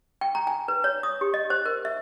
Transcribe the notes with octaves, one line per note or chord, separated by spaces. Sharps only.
G5
A#5
G#5
B4
C#5
D#6
G4
D#5
C5
A#4
E5